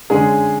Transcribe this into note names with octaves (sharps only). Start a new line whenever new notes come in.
D3 G#3 C#4 G#4